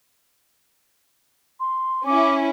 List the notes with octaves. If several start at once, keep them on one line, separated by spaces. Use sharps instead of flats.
C6
C#4 E4 D6